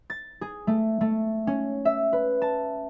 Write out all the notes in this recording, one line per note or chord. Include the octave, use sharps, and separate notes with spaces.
A6
G#4
A3
A3
C#4
E5
B4
A5